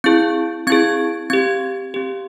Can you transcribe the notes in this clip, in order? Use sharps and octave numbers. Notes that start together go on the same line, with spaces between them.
C4 E4 G#4 G6
C4 E4 G#4 G#6
C4 G4 G#6
C4 G4